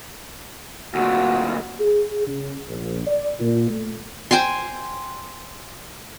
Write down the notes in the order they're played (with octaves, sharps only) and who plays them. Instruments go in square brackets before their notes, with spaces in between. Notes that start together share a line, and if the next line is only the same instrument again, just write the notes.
[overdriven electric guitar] D2 A#2 [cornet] F#4
[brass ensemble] G#4
C#3
A#1
D5
A#2
A3
[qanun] C5 G5 G#5 C6